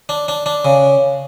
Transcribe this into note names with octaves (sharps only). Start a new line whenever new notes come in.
D4
D4
D4
C#3